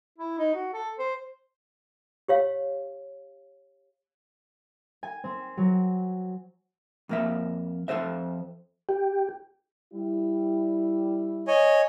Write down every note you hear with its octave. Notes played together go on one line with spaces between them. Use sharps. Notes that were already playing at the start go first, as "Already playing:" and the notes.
E4
D#4
F#4
A4
C5
G4 C#5 F5
G#5
C4
F#3
F2 A#3 E5
F2 C#3 A4 C5 E5
G4
G3 E4
C#5 D#5 G#5